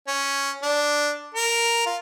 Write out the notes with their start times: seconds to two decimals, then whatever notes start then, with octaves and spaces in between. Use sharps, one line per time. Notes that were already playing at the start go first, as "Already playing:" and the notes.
0.07 C#4
0.63 D4
1.35 A#4
1.86 F4